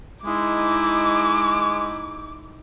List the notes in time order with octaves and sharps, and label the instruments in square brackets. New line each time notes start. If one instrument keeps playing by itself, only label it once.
[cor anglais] G#3 [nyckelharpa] D#4 E4 [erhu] D6